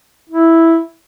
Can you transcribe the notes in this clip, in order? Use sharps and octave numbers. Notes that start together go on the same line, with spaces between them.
E4